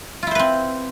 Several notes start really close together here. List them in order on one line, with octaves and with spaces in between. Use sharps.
F4 E4 C5 B4 C4